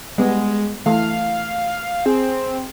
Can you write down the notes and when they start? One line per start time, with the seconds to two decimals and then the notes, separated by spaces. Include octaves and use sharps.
0.18 G3 G#3 B3
0.86 E3 A3 F5
2.06 C4 G#4